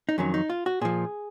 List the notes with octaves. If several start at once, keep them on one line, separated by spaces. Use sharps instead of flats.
D#4
F2 D#3 F#3 C#4
D#4
F4
F#4
A#2 F3 G#4